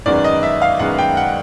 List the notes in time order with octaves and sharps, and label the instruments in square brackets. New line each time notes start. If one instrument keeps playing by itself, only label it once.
[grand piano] F#2 D#3 G#3 B3 D5
D#5
E5
F5
F#2 D#3 G#3 B3 F#5
G5
F#5